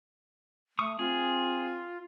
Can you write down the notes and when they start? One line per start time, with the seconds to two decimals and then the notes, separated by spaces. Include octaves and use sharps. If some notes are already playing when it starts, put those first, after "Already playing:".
0.79 A3 C#6 D#6
0.99 C4 F4 G#4